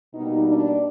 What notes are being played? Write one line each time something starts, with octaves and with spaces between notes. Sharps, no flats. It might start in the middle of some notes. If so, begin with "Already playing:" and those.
B2 G3 A#3 D#4
D4